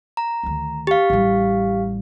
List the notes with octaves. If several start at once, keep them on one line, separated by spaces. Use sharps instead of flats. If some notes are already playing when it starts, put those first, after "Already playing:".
A#5
D2 D#3
G4 F5
A1 G3